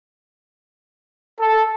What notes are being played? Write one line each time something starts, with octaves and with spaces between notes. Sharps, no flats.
A4